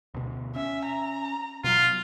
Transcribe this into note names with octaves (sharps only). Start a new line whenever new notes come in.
D2 B2
C#4 E5
A#5
B2 F#3 F4